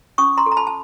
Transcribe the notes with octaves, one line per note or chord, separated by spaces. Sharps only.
C#4 C#6 D#6
A#5 C6
A4
A#5
A5 B5
A5